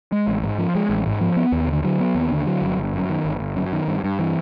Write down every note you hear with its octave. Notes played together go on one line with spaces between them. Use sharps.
G#3
A1
G#2
F3
G#3
A1
G#2
F3
B3
D#2
D3
F#3
B3
D#2
D3
F#3
G1
G1
F#2
D#3
G1
G1
F#2
D#3
G2
G2
E3